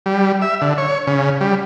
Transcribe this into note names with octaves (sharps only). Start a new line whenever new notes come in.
G3
E5
D3
C#5
C#3
G3